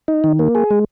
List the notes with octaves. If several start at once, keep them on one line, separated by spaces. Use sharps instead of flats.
D#4
D#3
A#3
G#4
G#3